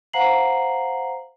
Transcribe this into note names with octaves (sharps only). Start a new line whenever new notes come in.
C5 F5 F#5 A#5 C7 F#7